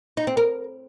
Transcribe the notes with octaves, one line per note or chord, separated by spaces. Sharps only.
D#4
C4
A#4